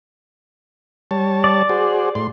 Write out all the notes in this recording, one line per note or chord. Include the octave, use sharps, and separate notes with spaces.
G3 C#5 A5
D5
F#4 G#4 C5
A2 C6